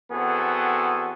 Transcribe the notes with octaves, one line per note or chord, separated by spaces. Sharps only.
E2 B3 C4 F#4 G#4 A4